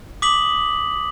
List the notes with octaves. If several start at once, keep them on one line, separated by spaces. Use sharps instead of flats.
D6 D#6 B6 F#7